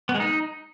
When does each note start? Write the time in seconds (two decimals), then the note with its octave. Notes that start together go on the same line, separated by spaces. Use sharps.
0.09 B3
0.15 G#3
0.20 D#4